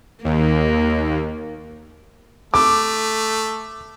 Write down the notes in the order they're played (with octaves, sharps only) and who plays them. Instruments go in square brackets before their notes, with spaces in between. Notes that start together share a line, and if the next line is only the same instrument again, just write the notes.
[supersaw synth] D#2 [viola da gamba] A#3
[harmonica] A3 [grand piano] D6